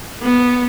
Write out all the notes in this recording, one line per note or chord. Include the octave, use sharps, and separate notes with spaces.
B3